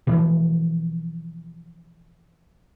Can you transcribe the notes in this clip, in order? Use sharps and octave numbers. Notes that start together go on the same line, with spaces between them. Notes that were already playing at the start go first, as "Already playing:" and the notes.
B2 E3 F3